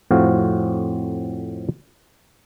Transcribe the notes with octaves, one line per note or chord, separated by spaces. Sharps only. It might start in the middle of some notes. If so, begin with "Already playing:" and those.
F2 A2 C4 F#4 F5